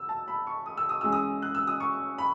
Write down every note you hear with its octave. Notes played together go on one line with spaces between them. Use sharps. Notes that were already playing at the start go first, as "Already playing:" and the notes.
Already playing: E3 E6
A5
B5
C#6
D#6
E6
D#6
E3 G#3 C#4 E6
D#6
F#6
E6
D#6
C#6
B5